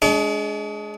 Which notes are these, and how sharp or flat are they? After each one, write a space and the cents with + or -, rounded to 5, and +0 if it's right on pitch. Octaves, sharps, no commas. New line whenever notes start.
G#3 +15 D4 -25 D5 -45